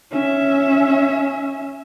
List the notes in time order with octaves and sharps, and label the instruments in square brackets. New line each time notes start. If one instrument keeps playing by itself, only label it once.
[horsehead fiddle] C#4 E5